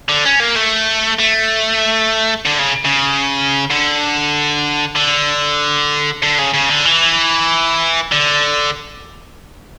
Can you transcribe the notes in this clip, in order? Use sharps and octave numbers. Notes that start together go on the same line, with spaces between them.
D3
C#4
A#3
A3
A3
D3
C#3
C#3
D3
D3
D3
C#3
C#3
D3
E3
D3